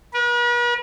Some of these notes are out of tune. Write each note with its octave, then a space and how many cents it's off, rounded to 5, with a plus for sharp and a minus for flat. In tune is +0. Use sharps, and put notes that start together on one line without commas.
B4 -45